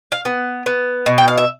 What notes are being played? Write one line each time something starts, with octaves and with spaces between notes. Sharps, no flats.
F5
B3
B3
B2
G5
F5
E5